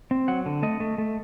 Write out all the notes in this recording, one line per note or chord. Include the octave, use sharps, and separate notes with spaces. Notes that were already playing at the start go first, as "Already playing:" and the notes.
C4
F#3 F#5
D3
A3 D#5
A3
A3